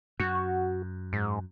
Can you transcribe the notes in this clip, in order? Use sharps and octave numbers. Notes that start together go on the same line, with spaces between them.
F#2 F#4
G#2